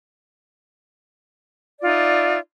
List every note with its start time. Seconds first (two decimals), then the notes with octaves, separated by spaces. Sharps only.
1.79 D5
1.81 F4
1.84 D#4
1.87 E5